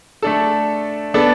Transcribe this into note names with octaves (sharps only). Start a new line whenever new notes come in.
A3 D4 A4
B3 D4 A4